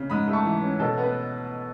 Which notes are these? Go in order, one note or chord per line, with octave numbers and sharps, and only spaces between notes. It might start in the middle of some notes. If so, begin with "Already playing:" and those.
Already playing: C#3
G#2 B5 D#6
A3
A5 C#6
E3
C#4
B2 A4
B3
B4